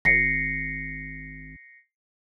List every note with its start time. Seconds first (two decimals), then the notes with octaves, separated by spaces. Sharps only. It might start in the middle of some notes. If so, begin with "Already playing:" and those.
0.05 G#1 A#6 C7 C#7